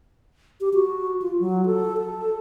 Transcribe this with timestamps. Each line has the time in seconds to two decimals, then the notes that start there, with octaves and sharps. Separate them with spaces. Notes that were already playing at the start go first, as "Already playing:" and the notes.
0.61 G4
0.74 F#4
1.22 F4
1.40 F#3
1.66 A4
1.98 A4